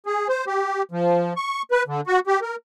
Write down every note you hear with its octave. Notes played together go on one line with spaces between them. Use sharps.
G#4
C5
G4
F3
C#6
B4
D3
F#4
G4
A#4